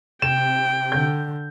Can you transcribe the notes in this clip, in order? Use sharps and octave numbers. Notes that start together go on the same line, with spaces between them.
C3 G5 E7
D3 G6